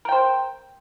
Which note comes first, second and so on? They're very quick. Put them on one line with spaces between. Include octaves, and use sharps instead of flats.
A#4 G5 C5